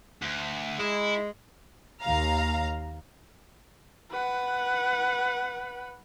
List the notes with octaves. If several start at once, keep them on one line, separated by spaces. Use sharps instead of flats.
D2
G#3 E4
D#2 F5 A#5
B4 F#5